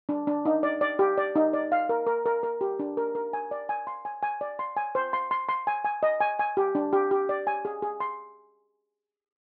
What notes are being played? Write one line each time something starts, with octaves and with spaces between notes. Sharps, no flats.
D4
D4
D#4
D5
D5
G4
D5
D#4
D5
F5
A#4
A#4
A#4
A#4
G4
D4
A#4
A#4
G#5
D5
G#5
C6
G#5
G#5
D5
C6
G#5
C5
C6
C6
C6
G#5
G#5
D#5
G#5
G#5
G4
D4
G4
G4
D5
G#5
G#4
G#4
C6